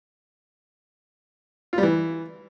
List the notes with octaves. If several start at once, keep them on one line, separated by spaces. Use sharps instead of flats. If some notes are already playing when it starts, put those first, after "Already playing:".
F4
G3
E3